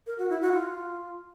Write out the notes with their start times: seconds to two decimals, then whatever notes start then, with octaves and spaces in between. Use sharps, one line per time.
0.07 A#4
0.18 F#4
0.30 E4
0.41 F#4
0.53 F4